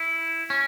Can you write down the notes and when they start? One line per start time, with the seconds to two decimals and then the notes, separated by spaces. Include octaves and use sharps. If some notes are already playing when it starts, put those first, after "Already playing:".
Already playing: E4
0.50 C#4